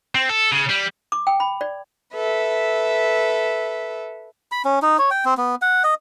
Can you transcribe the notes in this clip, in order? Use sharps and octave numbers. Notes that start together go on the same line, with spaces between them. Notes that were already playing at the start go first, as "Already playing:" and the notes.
C4
A4
C#3
G3
D6
G5
B5
D5
A4 B4 E5
B5
C#4
D#4
C#5
G5
C4
B3
F#5
D#5